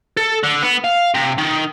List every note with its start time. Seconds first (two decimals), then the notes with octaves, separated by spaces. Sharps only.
0.17 A4
0.43 D3
0.62 B3
0.84 F5
1.15 C3
1.38 D#3